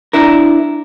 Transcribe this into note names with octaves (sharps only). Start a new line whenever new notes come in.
D4 E4 A#4